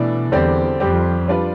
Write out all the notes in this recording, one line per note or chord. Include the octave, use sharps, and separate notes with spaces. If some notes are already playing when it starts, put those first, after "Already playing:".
Already playing: B2 E3 A3 D4
E2 D3 G3 C4 G4 D5
F2 G3 C4 G4
G3 D4 F4 B4 D5